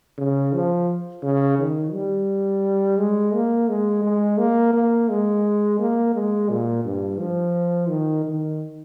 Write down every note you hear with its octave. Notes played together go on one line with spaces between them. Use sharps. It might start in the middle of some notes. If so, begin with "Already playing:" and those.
C#3
F3
C#3
D#3
G3
G#3
A#3
G#3
G#3
A#3
A#3
G#3
A#3
G#3
A#2
G2
F3
D#3
D#3